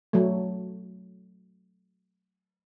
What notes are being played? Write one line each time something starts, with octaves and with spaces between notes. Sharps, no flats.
F#3 A3